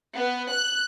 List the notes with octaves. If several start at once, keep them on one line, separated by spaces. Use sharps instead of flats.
B3
F#6